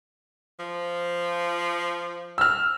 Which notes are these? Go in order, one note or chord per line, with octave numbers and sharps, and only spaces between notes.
F3
E6 F6